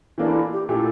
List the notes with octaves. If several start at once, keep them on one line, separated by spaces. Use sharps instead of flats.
E3 A#3 D4 A4
E4
F4
G4
A#2 A3 E4 G4 A4